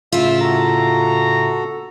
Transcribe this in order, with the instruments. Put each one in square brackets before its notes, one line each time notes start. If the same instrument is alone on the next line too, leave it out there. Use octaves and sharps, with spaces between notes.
[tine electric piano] A2 C#3 [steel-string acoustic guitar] E4 F4 [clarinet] E5
[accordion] F#4 A4 [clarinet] A#5